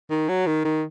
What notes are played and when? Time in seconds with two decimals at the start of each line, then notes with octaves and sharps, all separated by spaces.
0.10 D#3
0.29 F#3
0.47 D#3
0.65 D#3